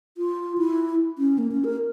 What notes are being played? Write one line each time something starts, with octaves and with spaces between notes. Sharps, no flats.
F4
E4
C#4
A#3
C#4
A#4